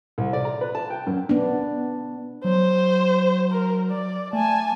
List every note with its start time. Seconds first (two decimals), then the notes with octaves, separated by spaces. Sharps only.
0.18 C2
0.33 D5
0.45 A#5
0.61 B4
0.75 A5
0.90 G5
1.07 F#2
1.29 B3 D4
2.44 F#3 C5
3.52 A#4
3.91 D5
4.33 A3 G#5 A5